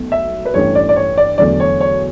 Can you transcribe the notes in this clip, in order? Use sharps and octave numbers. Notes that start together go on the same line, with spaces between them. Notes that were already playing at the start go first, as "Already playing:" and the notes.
Already playing: B1 B2 F#3 A3
E5
B4
A1 G2 E3 A3 C#5
D5
D5
C#5
D5
E2 D3 F#3 A3 D5
C#5
C#5